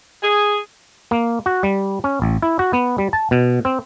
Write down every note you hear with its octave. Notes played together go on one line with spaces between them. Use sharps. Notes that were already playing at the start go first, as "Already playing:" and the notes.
G#4
A#3
F#4
G3
C#4
A1
E4
F#4
B3
G3
A5
B2
C4